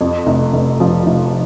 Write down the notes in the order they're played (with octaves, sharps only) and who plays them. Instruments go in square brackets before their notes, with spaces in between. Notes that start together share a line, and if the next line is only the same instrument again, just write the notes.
[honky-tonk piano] F2
F1
F1
F3
F1